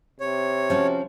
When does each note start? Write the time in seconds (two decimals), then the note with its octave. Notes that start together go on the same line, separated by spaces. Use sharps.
0.20 C3 C#5
0.70 F3 C#4 F#4